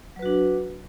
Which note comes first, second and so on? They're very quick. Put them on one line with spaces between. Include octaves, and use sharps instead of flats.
F#3 B4 F#4 D4